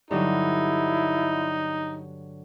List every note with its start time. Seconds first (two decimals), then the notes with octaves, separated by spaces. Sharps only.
0.11 G2 D3 F#3 D#4 E4